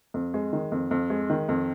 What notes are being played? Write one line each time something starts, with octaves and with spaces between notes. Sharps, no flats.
F2
G#3
D#3
F2
F2
G#3
D#3
F2